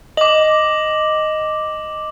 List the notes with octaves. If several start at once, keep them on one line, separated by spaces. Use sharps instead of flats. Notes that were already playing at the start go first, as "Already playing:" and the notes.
D#5 D6 F#7